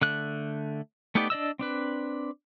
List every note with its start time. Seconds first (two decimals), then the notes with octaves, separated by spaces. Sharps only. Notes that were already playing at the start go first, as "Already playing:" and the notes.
0.02 D3 A3 F#6
1.15 A3 B3 D#4 G4 D5
1.30 D4 D5 D#5 E6
1.59 C4 D4 B4